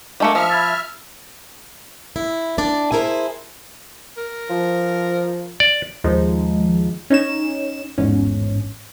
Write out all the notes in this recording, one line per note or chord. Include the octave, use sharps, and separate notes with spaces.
G3 A3 A#3 D#5 A#5 C#7
F3 E5 F6
B5 G#6 A6
E4
D4 D5
E4 G#4 A#4 C5
A#4
F3
D5
D#2 F3 G#3 D#4
C#4 D#4 C#5 E7
A1 E2 G#2 C#4